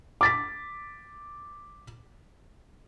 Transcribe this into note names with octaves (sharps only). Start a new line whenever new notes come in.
D6 A6 B6